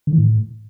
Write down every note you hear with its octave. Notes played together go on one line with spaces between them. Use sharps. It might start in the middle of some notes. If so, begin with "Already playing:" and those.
D3
E3
A2